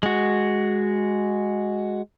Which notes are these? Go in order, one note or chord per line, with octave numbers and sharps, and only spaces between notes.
G#3 F#4